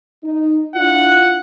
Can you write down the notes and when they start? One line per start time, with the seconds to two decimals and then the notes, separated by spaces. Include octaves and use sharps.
0.23 D#4
0.75 D4 E4 F4 F#5